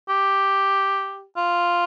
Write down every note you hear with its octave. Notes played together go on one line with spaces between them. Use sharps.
G4
F4